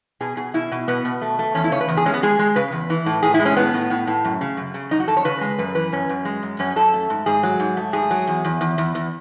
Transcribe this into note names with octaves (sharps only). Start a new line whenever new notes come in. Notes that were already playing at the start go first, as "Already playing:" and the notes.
B2 G#4
B2 G#4
B2 E4
B2
B2 B3
B2
A3
A3
E2 C#4
E4
C#3 C#5
B4
E2
G#4
G#3 C#4
B3
G#3 G#4
G#3
C#3 B4
E2
E3
A2
A2 G#4
E4
G#3
C#4
A2 B3
A2
A2
A2
F#2
C#3
F#2
C#3
F#2 D#4
F#4
F#2 A4
C#5
C#3 B4
G#3
F#2 B4
E3 B4
F#2 C#4
F#2
G#3
F#2
F#2 C#4
F#2 A4
A3
G#2
G#2 G#4
F#3
G#2
A3
G#2 G#4
F#3
E2
E2
E2
E2
E2